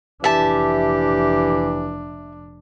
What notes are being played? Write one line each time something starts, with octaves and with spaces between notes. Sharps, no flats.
F1 E3 D4 G4 E5 A5